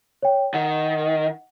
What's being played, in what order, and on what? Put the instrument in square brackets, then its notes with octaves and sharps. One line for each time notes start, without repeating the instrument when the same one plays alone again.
[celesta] C#5 G5
[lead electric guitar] D#3 [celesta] F#5